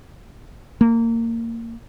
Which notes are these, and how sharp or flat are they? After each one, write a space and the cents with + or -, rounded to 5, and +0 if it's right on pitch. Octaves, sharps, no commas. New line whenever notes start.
A#3 -25